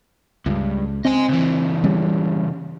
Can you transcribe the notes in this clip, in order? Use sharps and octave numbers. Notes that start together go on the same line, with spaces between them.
C#2 G2
C4 D#5 G#5
C#2 E3
C#3 G3 C#4